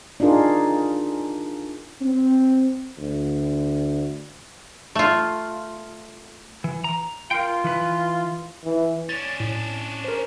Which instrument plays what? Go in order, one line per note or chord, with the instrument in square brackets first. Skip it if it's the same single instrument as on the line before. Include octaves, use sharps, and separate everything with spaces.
[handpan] D4 D#4 F4 G#4 A#4
[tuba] C4
D2
[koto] A3 F4
[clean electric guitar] E3
A#5
[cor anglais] F4 [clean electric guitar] A#4 F5 G5
[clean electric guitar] E3 B4
[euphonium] E3
[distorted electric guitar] C#4 D4 [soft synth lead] A6
[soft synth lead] A2
[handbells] A#4 C5